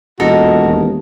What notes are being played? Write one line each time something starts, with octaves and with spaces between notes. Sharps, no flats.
E1 A#2 F#4 A4 A#4 D#5
D#2